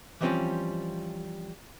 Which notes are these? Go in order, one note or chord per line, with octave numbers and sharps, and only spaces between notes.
E3 F3 G3 C4 C#4 F4